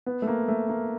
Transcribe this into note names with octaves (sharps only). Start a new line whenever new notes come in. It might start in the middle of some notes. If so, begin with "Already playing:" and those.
B3
A3
A#3
A3
A#3